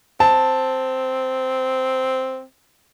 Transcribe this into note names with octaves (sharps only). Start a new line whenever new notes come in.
C4 A5